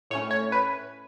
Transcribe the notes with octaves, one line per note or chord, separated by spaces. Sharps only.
A2 A3 C#4 C#5
C#5
B4